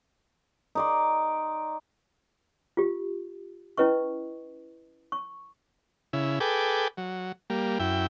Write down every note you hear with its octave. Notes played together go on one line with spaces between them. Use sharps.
D#4 D5 C6
F4 G4
C#4 E4 B4 D#5 C#6
C#6
C#3 E4
G#4 A4 B4 G5 D6
F#3
G3 A#3
F#2 E4 G5